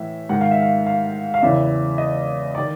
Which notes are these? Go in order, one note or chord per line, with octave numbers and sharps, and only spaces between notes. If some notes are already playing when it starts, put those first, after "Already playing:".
Already playing: A2 E3 E5
G#2 D#3 F#5
F5
E5
F5
F5
F5
E2 C#3 E3 E5
D#5
D#3 D5